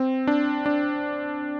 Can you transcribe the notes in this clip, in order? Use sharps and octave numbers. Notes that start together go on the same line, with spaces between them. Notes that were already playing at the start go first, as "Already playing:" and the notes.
Already playing: C4
D4
D4